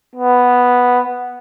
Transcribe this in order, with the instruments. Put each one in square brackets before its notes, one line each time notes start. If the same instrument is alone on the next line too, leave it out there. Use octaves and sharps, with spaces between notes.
[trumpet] B3